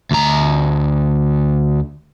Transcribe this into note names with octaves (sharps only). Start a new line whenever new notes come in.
D2 A#5